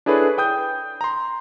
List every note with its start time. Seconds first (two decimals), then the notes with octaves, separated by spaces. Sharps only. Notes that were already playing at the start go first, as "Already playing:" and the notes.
0.06 D4 E4 G#4 A4 B4 C#5
0.38 G5 D#6 G6
1.01 A#5 C6